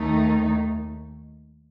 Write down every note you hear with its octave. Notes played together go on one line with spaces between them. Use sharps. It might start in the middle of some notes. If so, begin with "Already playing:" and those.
Already playing: D#2 D#3 A3 D#4